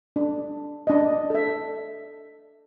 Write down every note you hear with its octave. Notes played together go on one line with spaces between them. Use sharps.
D4
D4 D#5
A4 E5